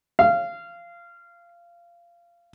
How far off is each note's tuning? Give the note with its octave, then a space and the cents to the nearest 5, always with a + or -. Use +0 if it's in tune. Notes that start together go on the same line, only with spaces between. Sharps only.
F5 -20